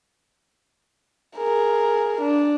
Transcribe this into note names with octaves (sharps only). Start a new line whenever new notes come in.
G#4 A#4
D4